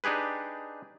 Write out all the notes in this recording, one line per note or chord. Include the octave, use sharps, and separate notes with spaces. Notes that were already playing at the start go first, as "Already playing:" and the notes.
D4 D#4 G4 G#4 B4